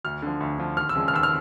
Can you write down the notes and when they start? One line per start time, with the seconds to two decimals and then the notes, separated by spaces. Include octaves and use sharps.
0.04 D2 F6
0.22 D3 F3
0.40 D2
0.58 D3 F3
0.77 D#2 F6
0.89 E6
0.95 C#3 F3 G#3
1.08 F6
1.13 D#2 E6
1.23 F6